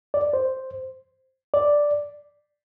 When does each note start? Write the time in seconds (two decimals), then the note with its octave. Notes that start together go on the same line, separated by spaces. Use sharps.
0.14 D5
0.33 C5
1.54 D5